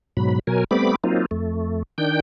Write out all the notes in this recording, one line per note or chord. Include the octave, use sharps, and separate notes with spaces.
G#2 B2 F#3 B5
B2 F#3 A#4 G#5
G3 A3 B3 C4 B5 D6
F#3 A#3 C4 D#4 F4
F2 A3
D#3 D4 G5 G6